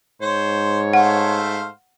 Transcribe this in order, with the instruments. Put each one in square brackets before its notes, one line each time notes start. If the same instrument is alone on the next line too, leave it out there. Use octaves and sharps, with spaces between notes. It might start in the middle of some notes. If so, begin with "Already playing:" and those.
[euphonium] G#2 [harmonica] C5 [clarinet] C#5
[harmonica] A3 C5 F5 [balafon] F#5